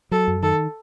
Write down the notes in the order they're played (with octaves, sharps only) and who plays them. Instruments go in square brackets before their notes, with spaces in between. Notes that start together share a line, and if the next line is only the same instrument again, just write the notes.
[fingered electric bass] F#3 [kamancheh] A4
[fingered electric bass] F#2
[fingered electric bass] D#3 [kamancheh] A4